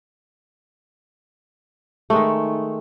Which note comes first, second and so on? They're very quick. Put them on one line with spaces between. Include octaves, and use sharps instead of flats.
A3 G#3 D#3